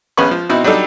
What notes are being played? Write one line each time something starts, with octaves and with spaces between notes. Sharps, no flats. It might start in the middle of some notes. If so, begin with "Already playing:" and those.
A#1 B3 C#4 B4 B5 C#6
F3
B2 C4 D#4 E4 F#4
F#3 G3 D4 D#4 A4